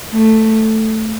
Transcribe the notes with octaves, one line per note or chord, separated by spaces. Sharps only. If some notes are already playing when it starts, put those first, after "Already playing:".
A3